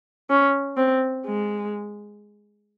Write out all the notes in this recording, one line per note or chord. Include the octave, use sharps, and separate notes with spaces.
C#4
C4
G#3